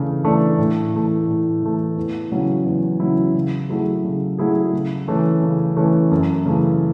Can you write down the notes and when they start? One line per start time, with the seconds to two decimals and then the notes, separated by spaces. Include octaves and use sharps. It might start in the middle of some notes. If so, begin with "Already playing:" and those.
Already playing: C#3 E3 A3 D4
0.24 E3 A3 D4
0.58 A2
0.93 E3 A3
1.28 A2
1.62 E3 A3
1.96 E2
2.32 C#3 F#3 C#4 E4
2.66 E2
3.00 C#3 F#3 C#4 E4
3.35 C#3
3.69 F#3 A3 E4 G#4
4.04 C#3
4.38 F#3 A3 E4 G#4
4.73 C#3
5.08 E3 A3 C#4
5.43 C#3
5.76 E3 A3 C#4
6.11 F#2
6.45 C#3 E3 A3